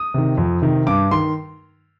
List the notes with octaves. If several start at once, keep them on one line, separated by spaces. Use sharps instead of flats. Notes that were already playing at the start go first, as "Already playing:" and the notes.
Already playing: D#6
C3 D#3
F2
C3 D#3
G2 D6
D#3 C6